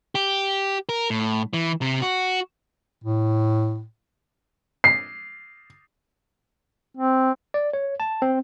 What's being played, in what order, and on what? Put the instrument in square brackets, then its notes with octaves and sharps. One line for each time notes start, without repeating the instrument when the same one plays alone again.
[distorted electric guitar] G4
A#4
A2
E3
C3
F#4
[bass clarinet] A2
[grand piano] C7
[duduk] C4
[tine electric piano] D5
C#5
A5
C4